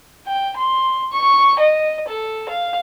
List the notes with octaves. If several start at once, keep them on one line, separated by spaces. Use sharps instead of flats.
G5
C6
C#6
D#5
A4
F5